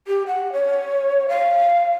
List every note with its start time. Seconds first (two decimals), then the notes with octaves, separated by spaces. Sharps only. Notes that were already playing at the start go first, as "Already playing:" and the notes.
0.07 G4
0.27 F#5
0.52 C#5
1.29 F5